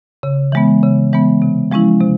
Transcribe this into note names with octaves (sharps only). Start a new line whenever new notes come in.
C#3
E3 G#3 B3
C#3
E3 G#3 B3
C3
F3 G#3 C#4 E4
C3